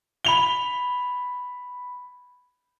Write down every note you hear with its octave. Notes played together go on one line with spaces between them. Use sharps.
B5 F7 G7